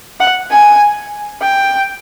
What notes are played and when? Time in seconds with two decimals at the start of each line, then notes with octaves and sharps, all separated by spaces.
0.20 F#5
0.51 G#5
1.42 G5